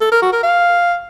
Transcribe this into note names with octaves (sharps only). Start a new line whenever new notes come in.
A4
A#4
F#4
A#4
F5